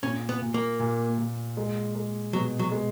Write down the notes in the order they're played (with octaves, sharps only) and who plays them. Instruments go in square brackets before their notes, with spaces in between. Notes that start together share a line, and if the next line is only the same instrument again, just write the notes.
[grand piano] A#2 [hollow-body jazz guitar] C#4
[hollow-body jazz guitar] B3
[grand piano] A#2
[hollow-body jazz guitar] A#3
[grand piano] A#2
A#2
G#3
G#3
[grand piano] B2 [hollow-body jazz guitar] F#3
[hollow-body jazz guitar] F#3
[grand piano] G#3